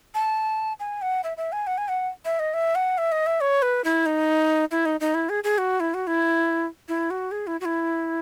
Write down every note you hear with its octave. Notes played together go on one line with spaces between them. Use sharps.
A5
G#5
F#5
E5
E5
G#5
F#5
G#5
F#5
E5
D#5
E5
F#5
E5
D#5
E5
C#5
B4
E4
D#4
E4
D#4
D#4
E4
G#4
G#4
F#4
E4
F#4
E4
E4
F#4
G#4
E4
F#4
E4